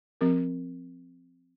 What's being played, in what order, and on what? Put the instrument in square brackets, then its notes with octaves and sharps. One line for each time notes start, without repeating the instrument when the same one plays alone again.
[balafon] F3 C4 G4 A#4